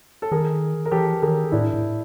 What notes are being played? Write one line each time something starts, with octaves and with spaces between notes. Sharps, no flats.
A4
D#3 G#4 A#4
A#4
E3 G4 A4
D#3 G#4 A#4
A2 D4 E4
A2